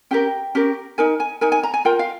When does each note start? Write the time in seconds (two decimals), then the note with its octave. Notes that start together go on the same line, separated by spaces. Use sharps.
0.11 C#4 G4 A#4 G5
0.55 C#4 G4 A#4
0.98 D#4 A#4 G#5
1.20 G#5
1.41 D#4 A#4 G#5
1.52 G#5
1.63 A#5
1.74 G#5
1.85 F4 A#4 G5
1.99 F5